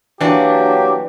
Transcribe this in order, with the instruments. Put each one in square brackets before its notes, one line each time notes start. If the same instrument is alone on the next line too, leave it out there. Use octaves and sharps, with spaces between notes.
[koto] E3 D4 [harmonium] F#3 A#3 F#4 [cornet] G4